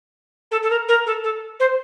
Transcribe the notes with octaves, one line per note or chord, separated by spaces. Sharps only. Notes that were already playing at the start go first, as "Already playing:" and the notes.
A4
A4
A#4
A#4
A4
A4
C5